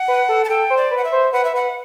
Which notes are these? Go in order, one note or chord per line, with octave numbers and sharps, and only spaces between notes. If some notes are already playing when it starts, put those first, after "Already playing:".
Already playing: F#5
B4
A4
A5
A4 G5
C5
D5
B4
F#5
E5
C5
B4 F#5
E5
B4 F#5